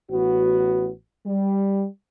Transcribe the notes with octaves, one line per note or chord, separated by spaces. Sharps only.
A1 B3 F#4
G3